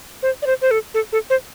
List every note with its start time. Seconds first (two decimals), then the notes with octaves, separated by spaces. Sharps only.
0.23 C5
0.42 D5
0.47 C5
0.62 C5
0.71 A4
0.94 A4
1.12 A4
1.30 C5